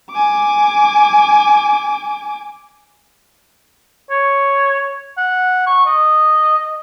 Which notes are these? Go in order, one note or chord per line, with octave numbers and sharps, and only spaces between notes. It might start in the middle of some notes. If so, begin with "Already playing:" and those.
G#5 D6
C#5
F#5
C#6
D#5